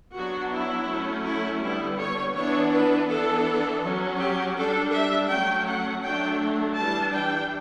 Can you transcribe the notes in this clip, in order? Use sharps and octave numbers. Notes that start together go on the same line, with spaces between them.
F#3 B3 D4 F#4
E4
F#3 A3 C#4
E4
D3 G3 B3 E4
C#5
E3 B3 D4 C#5
B4
E3 B3 D4 A4
F#3 C#4
G4
G3 D4 A4
E5
F#3 A3 C#4 G5
F#5
F#3 A3 D4 G5
E3 G3 D4 A5
G5